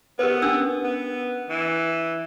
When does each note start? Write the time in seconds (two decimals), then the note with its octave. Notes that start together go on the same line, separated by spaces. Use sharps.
0.19 B3 G4 A#4 B4
0.42 C#4 D4 E6
0.84 B3
1.50 E3